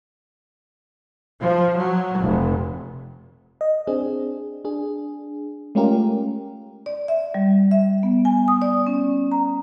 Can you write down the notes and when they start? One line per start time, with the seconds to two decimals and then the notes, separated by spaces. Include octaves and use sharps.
1.40 F3
1.76 F#3
2.18 F1
3.61 D#5
3.87 C4 D4 G#4
4.65 D4 G#4
5.75 G#3 A3 C#4 F4 G4 A#4
6.86 D5
7.08 E5
7.34 G3
7.71 E5
8.03 B3
8.25 G#5
8.48 D#6
8.62 D5
8.87 C#4
9.31 A#5